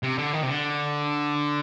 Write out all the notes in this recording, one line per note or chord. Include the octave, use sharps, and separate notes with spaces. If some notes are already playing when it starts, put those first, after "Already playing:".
C3
D3
D#3
C3
D3